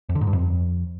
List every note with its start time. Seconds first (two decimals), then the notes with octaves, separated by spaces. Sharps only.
0.09 F2
0.15 D3
0.21 G#2
0.27 G2
0.33 F2